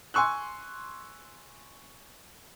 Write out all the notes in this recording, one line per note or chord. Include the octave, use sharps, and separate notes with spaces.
G#5 C6 C#6 E6 F#6